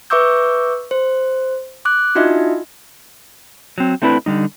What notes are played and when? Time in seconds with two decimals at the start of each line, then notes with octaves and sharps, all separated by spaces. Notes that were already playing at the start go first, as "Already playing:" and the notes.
0.10 B4 E5 C#6 D6 E6 G6
0.91 C5
1.85 D6 F#6
2.15 D4 D#4 F4 F#4 D#5 E5
3.78 F#3 C4
4.02 A3 C4 D4 E4 G4 B4
4.26 D3 G3 D#4